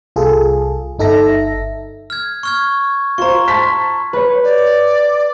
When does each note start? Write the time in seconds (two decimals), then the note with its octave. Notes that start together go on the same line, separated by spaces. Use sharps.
0.16 C2 F4 G#4 A4
0.99 G1 D#4 A4 E5 A#6
2.10 F6 G#6
2.43 C#6 F6 G#6
3.18 F4 C5 A#5 C#6
3.48 A5 C6 B6
4.13 B4 C#5
4.43 D5